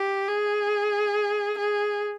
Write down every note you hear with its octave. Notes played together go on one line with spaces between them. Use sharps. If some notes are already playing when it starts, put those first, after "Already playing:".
Already playing: G4
G#4
G#4